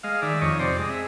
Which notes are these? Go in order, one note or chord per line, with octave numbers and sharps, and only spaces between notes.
G#3 D#5 F5
D#3 D5 E5
F2 C#5 D#5
C3 C5 D5
G#3 D#5
E5